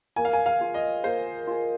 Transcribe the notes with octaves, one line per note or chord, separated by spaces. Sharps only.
A#3 G#5
F5
G#5
F5
F4 G#4
D#5
A#3 C5
F4 G#4